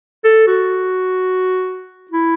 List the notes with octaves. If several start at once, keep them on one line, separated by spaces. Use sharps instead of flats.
A4
F#4
E4